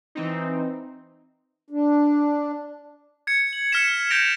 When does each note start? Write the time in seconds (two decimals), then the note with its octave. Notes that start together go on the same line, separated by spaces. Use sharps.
0.15 E3 C4 D#4
1.70 D4
3.27 G#6 C#7
3.53 F#7
3.72 F6 A#6 B6 C#7 E7
4.10 F6 G6 A6 A#6 D7 F7